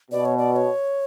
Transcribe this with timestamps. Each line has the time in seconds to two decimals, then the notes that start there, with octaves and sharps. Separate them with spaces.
0.11 B2 D5
0.25 C#5
0.38 D5
0.52 D5
0.56 C#5